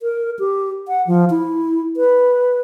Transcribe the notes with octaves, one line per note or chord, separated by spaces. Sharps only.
A#4
G4
F#5
F3
E4
B4